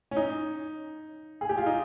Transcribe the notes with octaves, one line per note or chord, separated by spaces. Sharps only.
C#4
D#4
G#4
G4
F4
D#4